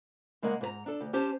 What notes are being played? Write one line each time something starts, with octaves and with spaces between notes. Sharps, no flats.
C#3 G#3 A#3 A#4 F#5
G#2 B4 A#5
D4 A4
D2
C#4 G4 C5 A5